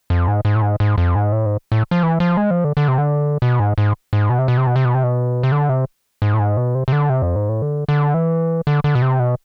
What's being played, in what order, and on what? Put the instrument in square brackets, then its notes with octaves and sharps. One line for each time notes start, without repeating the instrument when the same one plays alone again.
[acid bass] F2
G#2
G#2
A2
G#2
G#2
F2
G#2
A2
G#2
A2
F3
E3
F3
G#3
F3
D3
D3
C3
D3
B2
G#2
G#2
G#2
B2
C3
B2
C3
B2
C3
B2
C3
B2
C3
D3
C3
G#2
A2
G#2
B2
C3
C3
D3
C3
F2
G#2
A2
D3
D3
E3
D3
D3
B2
C3
B2